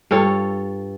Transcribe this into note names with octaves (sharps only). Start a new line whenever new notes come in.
G2 F4 A4 C#5